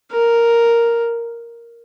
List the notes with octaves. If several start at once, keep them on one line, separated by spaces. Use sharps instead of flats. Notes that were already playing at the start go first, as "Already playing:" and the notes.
A#4